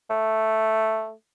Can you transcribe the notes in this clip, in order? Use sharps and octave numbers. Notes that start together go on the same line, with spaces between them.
A3